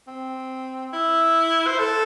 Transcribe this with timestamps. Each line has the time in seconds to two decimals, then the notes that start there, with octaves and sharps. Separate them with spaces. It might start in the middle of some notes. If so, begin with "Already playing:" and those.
0.07 C4
0.93 E4
1.67 C5
1.79 A4